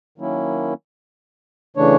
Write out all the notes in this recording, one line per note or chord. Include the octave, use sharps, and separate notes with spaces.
D#3 F#3 A#3 C#4 E4
C#3 E3 A3 D4 C#5